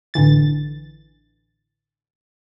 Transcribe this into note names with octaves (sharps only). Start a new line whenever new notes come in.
A1 D3 E3 A6